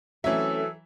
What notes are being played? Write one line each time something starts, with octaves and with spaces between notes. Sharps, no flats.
E3 F#3 A3 C4 C#4 A4 E5